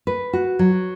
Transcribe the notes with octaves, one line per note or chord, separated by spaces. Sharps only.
B4
F#4
F#3